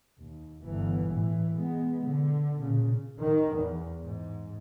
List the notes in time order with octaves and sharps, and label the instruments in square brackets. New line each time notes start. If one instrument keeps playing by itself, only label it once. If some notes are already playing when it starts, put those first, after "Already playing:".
[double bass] D#2
G1 E3
A2 E3
G#3 B3
D3
A#2 C#3
[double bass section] D#3
E2
G#2